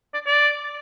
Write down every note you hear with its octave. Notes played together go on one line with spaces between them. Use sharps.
D5
D5